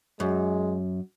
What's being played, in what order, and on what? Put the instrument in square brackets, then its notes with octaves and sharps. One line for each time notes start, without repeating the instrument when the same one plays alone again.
[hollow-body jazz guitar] F#2 [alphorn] G#3